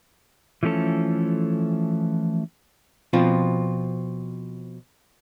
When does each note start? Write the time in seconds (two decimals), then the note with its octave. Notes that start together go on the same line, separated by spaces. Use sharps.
0.63 E3 F3 A3 C#4 A4
3.13 B2 F3 C4 F4